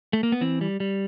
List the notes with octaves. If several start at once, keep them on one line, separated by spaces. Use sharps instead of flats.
A3
A#3
B3
E3 C4
G3
G3